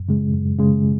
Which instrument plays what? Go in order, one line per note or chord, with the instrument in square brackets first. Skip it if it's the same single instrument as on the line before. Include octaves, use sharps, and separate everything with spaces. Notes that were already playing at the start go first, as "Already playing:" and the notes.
Already playing: [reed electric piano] F#2
C#3 G#3
F#2
C#3 G#3